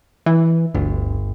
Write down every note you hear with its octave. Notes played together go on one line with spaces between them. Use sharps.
E3
G1 D2